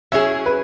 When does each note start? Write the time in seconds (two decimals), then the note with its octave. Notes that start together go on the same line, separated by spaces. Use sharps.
0.12 F#3 C#4 E4 G#4 E5
0.46 B4